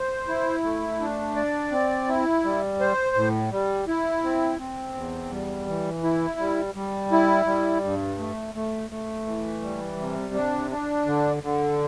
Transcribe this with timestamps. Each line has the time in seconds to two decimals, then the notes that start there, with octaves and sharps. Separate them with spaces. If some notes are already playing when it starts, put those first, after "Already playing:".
Already playing: C5
0.28 E4
0.64 A3
1.00 D4
1.36 D5
1.71 C4
2.08 E4
2.44 G3
2.80 C5
3.16 A2
3.51 G3
3.88 E4
4.24 C4
4.59 C4
4.95 E2
5.31 G3
5.68 E3
6.04 E4
6.39 G3
6.75 G3
7.12 E4
7.47 G3
7.84 G2
8.19 A3
8.55 A3
8.91 A3
9.27 E3
9.62 G3
9.99 C3
10.34 D4
10.71 D4
11.06 D3
11.43 D3